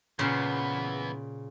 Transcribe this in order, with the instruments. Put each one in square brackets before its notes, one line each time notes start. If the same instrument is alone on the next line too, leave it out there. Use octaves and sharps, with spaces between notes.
[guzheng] A#2 C#3 C5 [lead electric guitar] E3 B3